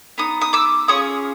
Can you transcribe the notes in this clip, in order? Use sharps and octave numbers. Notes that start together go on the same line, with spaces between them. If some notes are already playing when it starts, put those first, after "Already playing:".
B3 D#4 D#6
D#6
D6 E6
C#4 F4 G#4 C#6 D#6